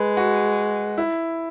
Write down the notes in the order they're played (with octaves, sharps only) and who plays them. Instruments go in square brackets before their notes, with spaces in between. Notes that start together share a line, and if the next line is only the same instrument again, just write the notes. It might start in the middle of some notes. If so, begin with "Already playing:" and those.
Already playing: [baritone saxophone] G#3 [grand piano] B4
[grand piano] F#4
E4